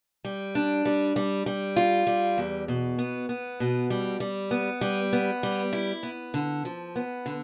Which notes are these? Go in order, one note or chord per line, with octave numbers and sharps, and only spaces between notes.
G3
D4
G3
G3
G3
F4
G3
E2
B2
B3
B3
B2
G3
G3
B3
G3
B3
G3
E4
B3
D3
F3
B3
D3